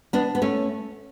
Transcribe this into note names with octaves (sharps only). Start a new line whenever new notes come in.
B3 D4
B3
A3 C#4